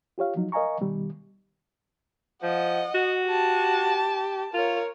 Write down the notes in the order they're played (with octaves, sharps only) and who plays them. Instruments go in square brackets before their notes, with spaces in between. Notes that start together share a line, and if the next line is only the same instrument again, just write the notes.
[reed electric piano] F4 G4 C#5 F5
F3 F#3 D#4
A#4 D#5 F5 G#5 A#5 C#6
B2 D#3 G3
[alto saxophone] F3 [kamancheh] D#5 F#5
[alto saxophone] F#4
[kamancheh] G4 A5
[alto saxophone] F4 [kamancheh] A#4 C#5